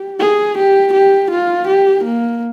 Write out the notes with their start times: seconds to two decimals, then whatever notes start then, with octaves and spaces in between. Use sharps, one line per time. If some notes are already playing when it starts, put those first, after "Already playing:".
Already playing: G4
0.20 G#4
0.57 G4
0.93 G4
1.30 F4
1.67 G4
2.03 A#3